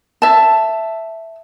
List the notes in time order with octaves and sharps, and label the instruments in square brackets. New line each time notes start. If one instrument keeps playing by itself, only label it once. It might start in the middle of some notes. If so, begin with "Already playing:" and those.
[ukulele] E5 A5